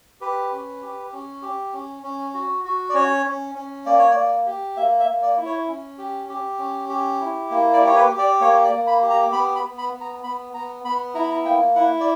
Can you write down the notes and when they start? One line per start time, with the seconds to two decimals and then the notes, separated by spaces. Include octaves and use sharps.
0.21 G4 B4
0.52 C#4
0.82 G4
1.13 C#4
1.42 G4
1.73 C#4
2.03 C#4
2.34 F#4
2.64 F#4
2.90 D5
2.94 C#4 C#5
3.25 C#4
3.55 C#4
3.86 A#3 D5
3.98 C#5
4.11 A#3 D5
4.46 G4
4.77 A#3 E5
5.00 E5
5.07 A#3
5.22 D5
5.37 E4
5.45 C#5
5.68 C#4
5.98 G4
6.29 G4
6.59 C#4
6.89 G4
7.20 E4
7.51 A#3
7.73 D5
7.81 G4
7.87 C#5
7.96 B4
8.11 G4
8.19 D5
8.41 A#3 C#5
8.64 D5
8.72 A#3
8.87 B5
9.02 G4
9.10 A#5
9.33 B3 B5
9.55 B5
9.63 B3
9.78 B5
9.93 B3
10.01 A#5
10.24 B3 B5
10.54 B3 A#5
10.85 B3 B5
11.15 E4 A#5
11.23 B5
11.31 A#5
11.45 A#3 G5
11.75 E4 F#5
12.00 D5